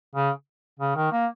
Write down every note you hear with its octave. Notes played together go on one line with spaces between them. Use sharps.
C#3
C#3
D#3
A#3